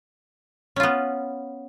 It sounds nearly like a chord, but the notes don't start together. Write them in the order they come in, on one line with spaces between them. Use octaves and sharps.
C#4 F4 B3